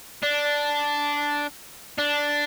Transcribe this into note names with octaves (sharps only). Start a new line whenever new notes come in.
D4
D4